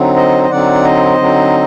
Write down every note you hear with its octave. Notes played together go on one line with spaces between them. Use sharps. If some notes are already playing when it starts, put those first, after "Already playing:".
Already playing: D3 F#3 C4 D#4
C5 D#5
D#5
D3 F#3 C4 D#4 D5 F#5
C5 D#5
D3 F#3 C4 D#4